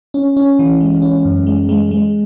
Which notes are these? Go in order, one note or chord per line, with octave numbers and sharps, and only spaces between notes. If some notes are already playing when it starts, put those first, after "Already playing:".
C#4
C#4
E3
G#3
C#4
F#2
G#3
G#3
G#3